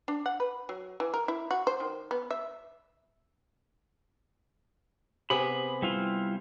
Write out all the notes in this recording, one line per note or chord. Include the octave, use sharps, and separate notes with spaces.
D4
F#5
B4
F#3
E3
A#4
E4
F#4
C5
D#3
B3
E5
C3 B3 G#4 B5
G3 E4 F4